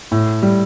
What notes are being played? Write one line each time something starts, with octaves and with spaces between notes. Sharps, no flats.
A2
G3